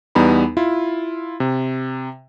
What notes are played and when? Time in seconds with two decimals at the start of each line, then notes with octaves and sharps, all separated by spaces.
0.15 E2 G3 B3 D#4 B5
0.57 E4 F4
1.40 C3